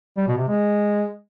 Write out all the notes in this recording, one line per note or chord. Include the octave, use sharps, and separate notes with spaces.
G3
B2
C3
G#3